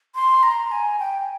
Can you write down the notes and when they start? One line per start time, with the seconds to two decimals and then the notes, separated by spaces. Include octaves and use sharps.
0.15 C6
0.43 A#5
0.71 G#5
0.99 G5